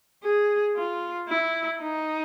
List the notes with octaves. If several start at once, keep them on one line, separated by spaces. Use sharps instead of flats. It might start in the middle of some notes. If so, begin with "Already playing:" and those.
G#4
F4
E4
D#4